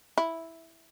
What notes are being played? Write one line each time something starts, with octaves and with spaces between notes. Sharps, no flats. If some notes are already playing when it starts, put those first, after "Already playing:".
E4